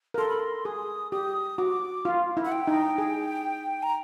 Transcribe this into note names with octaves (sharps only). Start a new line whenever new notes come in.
A#4
A4 C6
B5
C6
G#4 D#6
G4 D#6
F#4 D6
F4
E4
F#5
G5
D#4
G#4
A#5